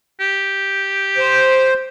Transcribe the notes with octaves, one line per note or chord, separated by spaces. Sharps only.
G4
C5